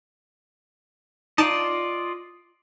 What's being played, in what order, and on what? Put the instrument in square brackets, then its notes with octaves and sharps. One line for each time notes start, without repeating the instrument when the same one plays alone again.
[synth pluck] D#4 A5 D#7 [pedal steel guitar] F4 D5 D#5